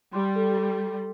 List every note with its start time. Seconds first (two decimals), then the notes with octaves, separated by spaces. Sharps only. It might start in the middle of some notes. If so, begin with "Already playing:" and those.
0.13 G3 C6
0.36 A4